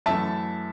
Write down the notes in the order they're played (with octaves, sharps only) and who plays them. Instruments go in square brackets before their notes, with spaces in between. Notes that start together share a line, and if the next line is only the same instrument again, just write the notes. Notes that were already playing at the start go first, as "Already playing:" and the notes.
[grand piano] F#2 E3 A3 E5 A5